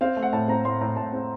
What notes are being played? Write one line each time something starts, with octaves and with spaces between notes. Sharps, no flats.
C4 F5
A3
F#5
A2 A5
C4 A#5
A2 C6
A2 A#5
A2 A5
C4